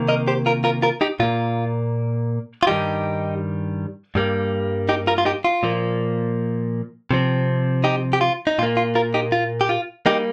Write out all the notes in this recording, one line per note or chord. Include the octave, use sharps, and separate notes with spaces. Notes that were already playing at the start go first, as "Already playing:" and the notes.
Already playing: C3 D#3 A#3
A#4 D#5
G4 C5
F4 A#4
F4 A#4
F4 A#4
D#4 G4
A#2 A#3 F4
F4
G2 D#3 G3 D#4 G4
G2 G3 A#3
D#4 G4
F4 A#4
F4
D#4 G4
F4
A#2 F3 A#3
C3 F3 C4
D#4 G4
G4
F4
D#4
A#2 A#3 F4
F4
F4 A#4
D#4 G4
F4
G4
F4
G3 A#3 D#4 G4